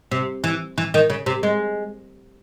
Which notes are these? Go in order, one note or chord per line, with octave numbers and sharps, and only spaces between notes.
C3
E3
E3
D#3
C#3
C3
G#3